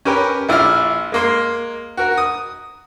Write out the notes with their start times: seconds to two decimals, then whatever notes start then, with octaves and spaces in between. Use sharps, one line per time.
0.05 C#4 G4 A#4 B4
0.49 A#1 E4 F4 D5 F6
1.12 G#3 A#3 C6
1.97 F#4 A#4
2.17 D#6